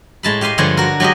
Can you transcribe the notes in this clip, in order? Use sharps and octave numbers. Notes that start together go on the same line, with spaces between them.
A2 G#3 A5 B5
G4 F5 G#5 C6
G2 D3 F3 G#3 D4 C#5
F#4 A#4
F#3 G#3 G4 A#4 D#5